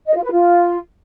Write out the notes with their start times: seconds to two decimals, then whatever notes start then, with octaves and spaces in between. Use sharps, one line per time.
0.07 D#5
0.15 F4
0.23 B4
0.32 F4